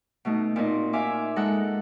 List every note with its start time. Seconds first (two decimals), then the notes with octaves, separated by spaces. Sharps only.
0.25 B2 A3 D#4
0.56 A#2 C4 D#4
0.93 E5 F5 G#5 D6
1.36 G#3 D#4 A4 A#4 F#5